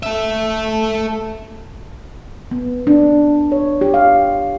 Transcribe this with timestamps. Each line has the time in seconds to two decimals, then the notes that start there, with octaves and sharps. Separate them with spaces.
0.03 A4 E5
2.51 B3
2.87 D4
3.52 C#5
3.81 G4
3.94 F5